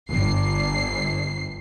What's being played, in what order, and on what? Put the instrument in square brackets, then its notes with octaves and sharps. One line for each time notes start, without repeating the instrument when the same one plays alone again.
[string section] G1 C7